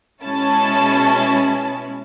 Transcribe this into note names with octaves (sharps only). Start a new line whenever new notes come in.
B2 G#3 C#4 E4 A5